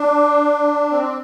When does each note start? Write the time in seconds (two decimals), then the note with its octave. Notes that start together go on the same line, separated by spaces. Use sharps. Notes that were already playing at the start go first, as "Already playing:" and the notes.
Already playing: D4
0.91 C4